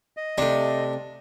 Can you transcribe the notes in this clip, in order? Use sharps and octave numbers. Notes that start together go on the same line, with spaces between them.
D#5
C3 A3 D4